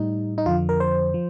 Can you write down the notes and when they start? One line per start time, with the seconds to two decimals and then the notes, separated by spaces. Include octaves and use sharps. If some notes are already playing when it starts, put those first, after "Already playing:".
Already playing: A2 G3 D#4
0.38 D#4
0.46 F2 D3 F3 F4
0.69 A#4
0.80 C5
1.14 F3